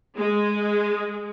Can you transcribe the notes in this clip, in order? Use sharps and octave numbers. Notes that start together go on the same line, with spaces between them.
G#3